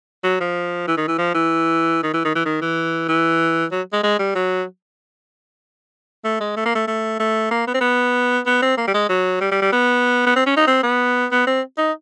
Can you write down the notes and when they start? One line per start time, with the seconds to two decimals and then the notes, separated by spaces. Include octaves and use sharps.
0.24 F#3
0.40 F3
0.88 E3
0.98 D#3
1.08 E3
1.18 F3
1.35 E3
2.03 D#3
2.14 E3
2.25 D#3
2.35 E3
2.46 D#3
2.61 E3
3.09 E3
3.72 F#3
3.93 G#3
4.03 G#3
4.19 G3
4.35 F#3
6.25 A3
6.40 G#3
6.57 A3
6.65 A#3
6.75 A3
6.88 A3
7.20 A3
7.51 A#3
7.67 B3
7.74 C4
7.81 B3
8.46 B3
8.62 C4
8.77 A#3
8.87 G3
8.94 G#3
9.09 F#3
9.41 G3
9.52 G3
9.62 G3
9.73 B3
10.26 B3
10.36 C4
10.46 C#4
10.57 D#4
10.67 C4
10.83 B3
11.31 B3
11.47 C4
11.78 D#4